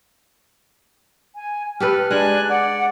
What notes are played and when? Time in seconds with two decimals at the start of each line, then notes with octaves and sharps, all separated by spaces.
1.35 G#5
1.80 G4 A4 B4 F6
2.11 G#3 D4 G#5 F#6
2.50 D5 F#5